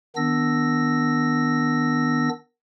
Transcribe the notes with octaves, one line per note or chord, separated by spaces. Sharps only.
D#3 B3 D4 E6 A#6